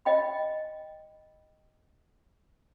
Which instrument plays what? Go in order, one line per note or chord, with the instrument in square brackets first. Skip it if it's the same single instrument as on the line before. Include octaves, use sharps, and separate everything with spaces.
[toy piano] D#5 G5 B5